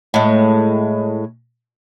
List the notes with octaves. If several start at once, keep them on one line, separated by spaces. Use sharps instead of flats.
A2 G#3